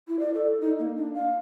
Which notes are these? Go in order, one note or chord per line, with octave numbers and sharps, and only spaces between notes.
E4
D5
A4
D#4
A#3
D4
F5